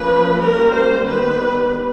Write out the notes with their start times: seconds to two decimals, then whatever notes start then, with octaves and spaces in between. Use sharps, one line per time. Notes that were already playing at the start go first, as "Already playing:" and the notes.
Already playing: F3 A#3 C#4 B4
0.39 G3 A#3 C#4 A#4
0.73 C5
1.06 D#3 G3 B3 B4